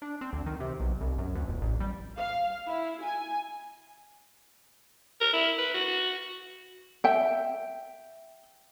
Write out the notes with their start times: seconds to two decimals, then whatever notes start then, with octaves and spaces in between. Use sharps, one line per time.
0.02 D4
0.21 C4
0.33 D2
0.46 D#3
0.60 C3
0.80 B1
1.01 C2
1.18 F#2
1.35 D2
1.48 D#1
1.61 A1
1.80 G3
2.18 F5
2.68 E4
3.05 G#5
5.21 A#4
5.33 E4
5.58 B4
5.74 F#4
7.04 E5 G5